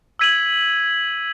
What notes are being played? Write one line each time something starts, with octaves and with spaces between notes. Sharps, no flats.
E6 G#6 B6 D#7 F#7